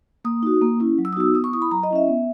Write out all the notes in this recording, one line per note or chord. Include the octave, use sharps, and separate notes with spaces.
A#3 D#6
D#4 F#4
A#3
C#4 E4
F#3
E6
D#6
B3 D#4 F#4 E6
B3 D#6
C#6
E4 D#6
B5
F#3 A#5
D#5
C#4 E4 E5
B3